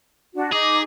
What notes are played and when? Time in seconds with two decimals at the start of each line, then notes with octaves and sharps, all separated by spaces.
0.35 D4 F#4
0.52 D#4 G#4 D6